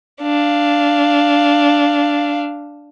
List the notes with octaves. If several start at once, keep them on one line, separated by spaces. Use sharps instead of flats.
D4 F5